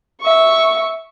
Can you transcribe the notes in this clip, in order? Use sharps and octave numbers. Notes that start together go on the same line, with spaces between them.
E5 C#6